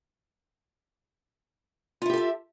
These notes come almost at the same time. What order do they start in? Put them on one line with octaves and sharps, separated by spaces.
F4 E4 G4 A4 E5